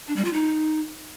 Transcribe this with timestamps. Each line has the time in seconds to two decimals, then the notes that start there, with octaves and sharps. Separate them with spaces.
0.08 D4
0.16 G3
0.25 F4
0.33 D#4